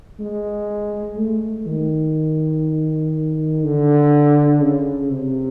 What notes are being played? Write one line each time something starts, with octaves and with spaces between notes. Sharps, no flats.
G#3
A3
D#3
D3
C#3
C3